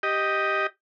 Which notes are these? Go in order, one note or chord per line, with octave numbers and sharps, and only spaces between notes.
G4 D#5